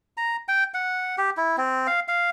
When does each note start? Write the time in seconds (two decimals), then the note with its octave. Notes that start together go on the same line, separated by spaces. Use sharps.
0.17 A#5
0.48 G5
0.74 F#5
1.18 G4
1.37 E4
1.58 C4
1.87 F5
2.08 F5